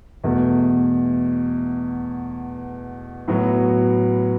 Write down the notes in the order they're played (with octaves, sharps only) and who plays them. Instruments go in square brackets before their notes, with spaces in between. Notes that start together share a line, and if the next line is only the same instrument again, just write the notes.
[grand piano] E2 B2 A3
A2 F#3 B3 F#4